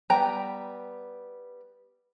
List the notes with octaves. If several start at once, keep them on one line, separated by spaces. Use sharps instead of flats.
G3 B3 G5 A#5